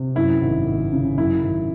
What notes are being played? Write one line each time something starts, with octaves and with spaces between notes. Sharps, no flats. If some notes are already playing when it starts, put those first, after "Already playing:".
Already playing: C3
F#2 E4
G#1
G#1
C#3
F#2 E4
G#1